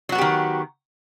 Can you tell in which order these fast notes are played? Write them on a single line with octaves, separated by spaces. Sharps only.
F#3 F#4 B3 G4 D#3